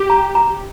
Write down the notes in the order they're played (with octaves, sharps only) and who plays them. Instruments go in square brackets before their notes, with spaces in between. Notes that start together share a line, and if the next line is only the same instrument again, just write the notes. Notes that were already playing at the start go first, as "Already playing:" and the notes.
Already playing: [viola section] G4
[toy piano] A#5
A#5